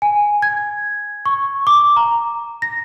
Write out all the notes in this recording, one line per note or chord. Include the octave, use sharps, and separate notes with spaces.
G#5
G#6
C#6
D6
A#5
A#6